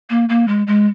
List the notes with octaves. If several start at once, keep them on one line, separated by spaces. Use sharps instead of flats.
A#3
A#3
G#3
G#3